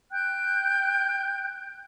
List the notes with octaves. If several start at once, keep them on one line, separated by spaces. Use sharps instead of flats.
G5 F#6 G6